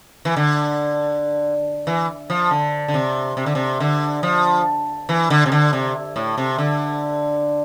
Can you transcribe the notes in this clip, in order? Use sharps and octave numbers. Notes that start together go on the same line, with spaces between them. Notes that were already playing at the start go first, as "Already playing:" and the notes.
E3
D3
E3
F3
D3
D3
C3
C3
D3
C3
D3
F3
E3
D3
C3
D3
C3
A2
C3
D3